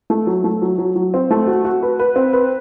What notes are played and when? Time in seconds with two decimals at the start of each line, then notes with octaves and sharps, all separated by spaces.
0.10 A3
0.27 F#3
0.44 A3
0.62 F#3
0.78 F#3
0.96 F#3
1.14 C4
1.31 A3
1.47 F#4
1.65 F#4
1.82 B4
1.99 B4
2.16 C4
2.33 B4